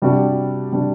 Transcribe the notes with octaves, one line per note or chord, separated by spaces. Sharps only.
C3 G3 D4 F#4
C3 G3 D4 F#4